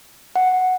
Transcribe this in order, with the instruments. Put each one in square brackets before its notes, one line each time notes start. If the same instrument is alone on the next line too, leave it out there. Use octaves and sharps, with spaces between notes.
[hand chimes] F#5